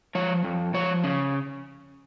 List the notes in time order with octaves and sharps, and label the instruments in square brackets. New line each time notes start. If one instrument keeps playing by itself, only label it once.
[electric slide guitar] F3 C#5
F2
F3 C#5
C#3